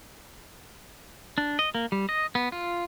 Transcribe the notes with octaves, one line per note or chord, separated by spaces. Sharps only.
D4
D#5
A#3
G3
D#5
B3
F4